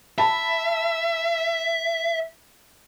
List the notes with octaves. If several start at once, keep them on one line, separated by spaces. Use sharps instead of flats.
E5 A5 B5